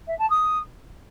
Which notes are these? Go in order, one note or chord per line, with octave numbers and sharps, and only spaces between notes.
E5
A5
D#6